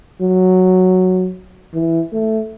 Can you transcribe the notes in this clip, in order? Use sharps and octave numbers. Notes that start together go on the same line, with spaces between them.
F#3
E3
A3